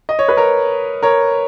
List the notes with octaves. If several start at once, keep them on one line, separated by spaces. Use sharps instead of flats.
D#5
C#5
B4
A#4 C#5
A#4 C#5